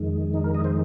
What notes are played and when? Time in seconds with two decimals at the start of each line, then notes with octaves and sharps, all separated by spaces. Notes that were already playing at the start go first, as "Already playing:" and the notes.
Already playing: F2 D#3 G#3
0.34 D#4
0.44 A#4
0.54 D#5
0.64 C5